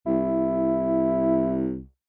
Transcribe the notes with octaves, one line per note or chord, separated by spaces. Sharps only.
C2 E4